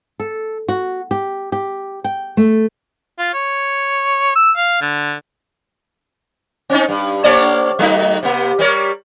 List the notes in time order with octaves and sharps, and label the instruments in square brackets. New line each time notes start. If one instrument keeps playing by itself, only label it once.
[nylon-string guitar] A4
F#4
G4
G4
G5
A3
[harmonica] F4
C#5
E6
F5
D3
[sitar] C4 C#4 D#4
G2
A3 C#5 D5
F#3 A3 D#4
C3 A#3
G3 A#4 C#5